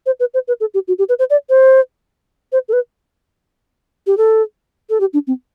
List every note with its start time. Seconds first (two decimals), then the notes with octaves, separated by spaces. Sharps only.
0.06 C5
0.20 B4
0.34 C5
0.48 B4
0.60 A4
0.74 G4
0.88 F#4
0.99 G4
1.09 B4
1.19 C5
1.30 D5
1.50 C5
2.52 C5
2.69 A4
2.73 B4
4.07 G4
4.17 A4
4.90 A4
5.00 G4
5.13 D4
5.27 C4